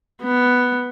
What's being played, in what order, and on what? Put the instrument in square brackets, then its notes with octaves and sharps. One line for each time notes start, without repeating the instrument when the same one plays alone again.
[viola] B3